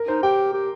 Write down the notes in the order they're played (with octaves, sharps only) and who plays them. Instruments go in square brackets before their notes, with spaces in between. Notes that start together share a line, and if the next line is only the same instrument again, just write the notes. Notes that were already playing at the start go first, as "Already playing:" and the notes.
Already playing: [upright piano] A#4
[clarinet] D#4 [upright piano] C5
[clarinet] G4 [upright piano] G5
[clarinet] G4